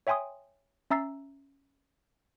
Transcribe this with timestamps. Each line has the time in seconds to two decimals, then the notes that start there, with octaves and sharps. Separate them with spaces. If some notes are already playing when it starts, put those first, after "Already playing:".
0.07 C#5 E5 G5 G#5 C6 D#6
0.90 C#4 E5 A#5 E6 A6 C7